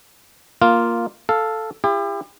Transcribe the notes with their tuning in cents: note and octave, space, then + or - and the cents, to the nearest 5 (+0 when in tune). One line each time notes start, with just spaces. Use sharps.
A#3 +0 F4 +0
A4 +0 F5 +0
E4 +40 G4 +40